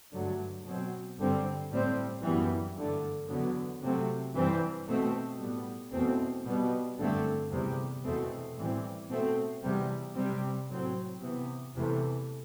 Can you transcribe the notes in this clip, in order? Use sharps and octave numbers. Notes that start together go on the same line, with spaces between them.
G2 D3 F#3 A3
B2 F#3 C4
G2 D3 G3 C4
A2 G3 C4
F#2 E3 G3 B3
G2 D3 A3
E2 D3 F#3 B3
C3 F#3 A3 C4
G2 E3 G3 C4
B2 A3 C4
A2 G3 B3
E2 B2 A3 C4
B2 G3 B3
G2 D3 A3 C4
E2 C3 G3
E2 B2 A3 C4
A2 E3 G3 C4
B2 A3 C4
E2 C3 G3
C3 G3 C4
A2 F#3 C4
C3 E3 B3
E2 C3 E3 A3